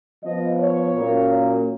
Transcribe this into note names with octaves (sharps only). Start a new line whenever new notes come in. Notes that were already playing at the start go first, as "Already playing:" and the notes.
F3 B3 D#5
C#5
A#2 F#3 A#3 C#4